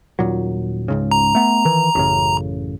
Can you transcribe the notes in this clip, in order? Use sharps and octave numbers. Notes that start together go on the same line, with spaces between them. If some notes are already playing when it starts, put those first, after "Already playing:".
D#1 A#2 F#3
C#2 G#2 C#3
A#5
A3 B3
D#3 E3
A1 F#2 C#3